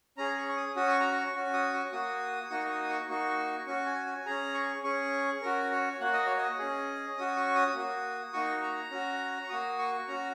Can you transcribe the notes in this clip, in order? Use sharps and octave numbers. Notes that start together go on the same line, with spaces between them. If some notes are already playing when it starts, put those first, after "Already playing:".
C#4 G#4 A#5
C#6
C#6
D#6
C#4 F#4 D#6
C#6
A#5
C#6
C#4 F#4
D#6
C#6
A#3 F#4 D#6
A#3 D#4 F#4 C#6
C#6
D#6
C#6
A#3 D#4 F#4 C#6
C#4 F#4 C#6
G#5
G#5
C#4 G#4 A#5
C#6
C#4 G#4 C#6
C#4 F#4 A#4
C#5
A#3 F#4 F#5
D#5
C#5
D#5
C#4 G#4
C#4 F#4 D#6
C#6
D#6
A#3 F#4
A#3 D#4 F#4 C#6
A#5
C#4 F#4
C#6
A#3 F#4 D#6
C#6
C#4 F#4 A#5